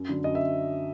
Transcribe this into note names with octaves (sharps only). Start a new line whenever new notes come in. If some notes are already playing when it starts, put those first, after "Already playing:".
Already playing: F#2
D3 F#3
F#2 D#5
E5